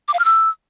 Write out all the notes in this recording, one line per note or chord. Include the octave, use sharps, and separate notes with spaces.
D6
F5
F6
E6